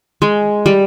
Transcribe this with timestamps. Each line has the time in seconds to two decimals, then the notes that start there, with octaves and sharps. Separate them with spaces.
0.22 G#3
0.66 G3